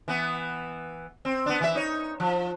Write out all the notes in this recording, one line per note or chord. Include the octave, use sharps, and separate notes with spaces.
E3 B3
C4
B3 D4
E3 E5
D#4 C#5
F3